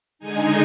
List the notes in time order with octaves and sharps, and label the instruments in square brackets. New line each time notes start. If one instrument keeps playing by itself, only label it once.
[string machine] D3 G#3 D#4 G#5